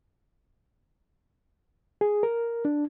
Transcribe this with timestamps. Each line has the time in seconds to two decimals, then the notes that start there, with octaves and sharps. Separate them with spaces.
2.01 G#4
2.23 A#4
2.65 D4